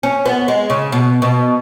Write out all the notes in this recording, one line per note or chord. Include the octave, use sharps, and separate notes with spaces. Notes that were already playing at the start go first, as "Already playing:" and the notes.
C#4
B3
G#3
C#3
B2
B2